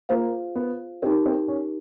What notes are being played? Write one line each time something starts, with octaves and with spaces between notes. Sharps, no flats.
A#3 F4 G#4 C5 F5
B3
C4 D#4 G4 A#4
C4
C#4